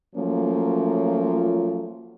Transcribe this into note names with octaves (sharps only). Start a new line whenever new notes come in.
F3 F#3 A3 A#3 C#4 F4